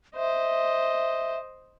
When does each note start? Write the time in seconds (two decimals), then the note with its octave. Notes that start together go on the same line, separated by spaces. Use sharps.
0.16 C5 D#5 E5